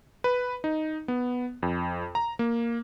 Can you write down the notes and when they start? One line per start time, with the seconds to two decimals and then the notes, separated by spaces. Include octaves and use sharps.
0.24 B4
0.64 D#4
1.08 B3
1.63 F2
2.15 A#5
2.39 A#3